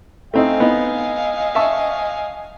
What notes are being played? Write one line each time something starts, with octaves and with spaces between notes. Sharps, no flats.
A3 C4 D#4 D#5 F5 G#5
B3 D#4
E5 A5 C#6